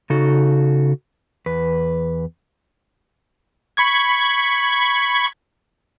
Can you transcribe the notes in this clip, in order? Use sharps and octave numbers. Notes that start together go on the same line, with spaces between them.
C#3 D#4 F#4 A4
E2 B4
B5 C#6 G#6